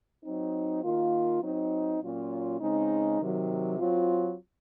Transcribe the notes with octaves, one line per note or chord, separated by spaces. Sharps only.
F#3 C4 D#4
D#3 A#3 F4
F#3 C4 D#4
A#2 F#3 C#4 F4
C#3 G#3 C4 D#4
C3 D#3 F#3
F#3 C4 F4